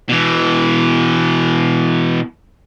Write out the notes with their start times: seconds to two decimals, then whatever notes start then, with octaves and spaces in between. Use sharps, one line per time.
0.09 B2 E3